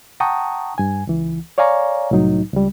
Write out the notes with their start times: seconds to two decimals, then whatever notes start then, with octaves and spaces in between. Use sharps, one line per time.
0.20 F#5 G5 A5 A#5 C#6 D#6
0.78 G2 G#5
1.07 C#2 E3
1.58 C#5 D5 F5 G#5 A#5 C#6
2.11 C2 A2 F#3 D#4
2.53 C#2 G3